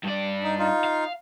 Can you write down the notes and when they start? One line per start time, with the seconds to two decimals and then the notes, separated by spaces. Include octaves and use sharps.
0.04 G2 D5
0.43 D#4
0.59 D#4 F4
0.84 F5